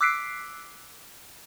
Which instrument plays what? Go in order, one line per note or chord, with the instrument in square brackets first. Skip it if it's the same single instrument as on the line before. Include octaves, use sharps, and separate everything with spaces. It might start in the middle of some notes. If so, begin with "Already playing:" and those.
[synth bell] D6 E6 F#6 B6 C7 D7